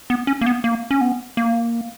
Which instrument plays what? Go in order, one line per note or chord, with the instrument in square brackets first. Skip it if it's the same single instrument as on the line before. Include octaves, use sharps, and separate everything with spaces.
[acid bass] B3
C#4
A#3
B3
A#3
C#4
B3
A#3